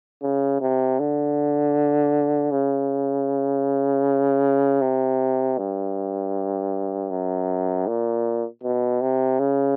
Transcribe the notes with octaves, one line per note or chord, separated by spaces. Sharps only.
C#3
C3
D3
C#3
C3
G2
F#2
A#2
B2
C3
C#3